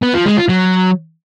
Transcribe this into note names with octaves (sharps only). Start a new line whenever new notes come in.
B3
F3
G#3
F4
F#3